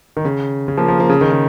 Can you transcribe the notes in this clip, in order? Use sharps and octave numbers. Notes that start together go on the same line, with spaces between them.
D#3
C#3
C#3
F3 A#3
F3 A#3
F3 A#3
C#3
D#3
C#3